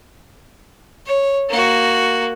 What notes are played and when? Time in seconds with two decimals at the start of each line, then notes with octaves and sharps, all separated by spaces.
1.06 C#5
1.49 A#3 F#4